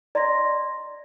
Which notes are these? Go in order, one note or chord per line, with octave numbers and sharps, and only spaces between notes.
D5 D#5 A#5 C6 A#6